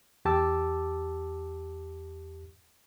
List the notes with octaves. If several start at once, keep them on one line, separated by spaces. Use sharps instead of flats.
E2 G4 A5 D6 E6